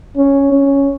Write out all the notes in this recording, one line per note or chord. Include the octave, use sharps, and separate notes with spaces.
C#4
C#4